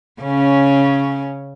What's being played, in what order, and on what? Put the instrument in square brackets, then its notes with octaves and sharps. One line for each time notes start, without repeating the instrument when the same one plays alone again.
[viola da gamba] C#3 C#4